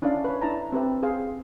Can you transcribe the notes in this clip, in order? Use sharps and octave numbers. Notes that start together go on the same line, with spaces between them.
C#4 D4 E4 D5 F5
B4 C#5
D4 E4 A5 A#5
C4 G4 B4 E5
G#4 C5 F5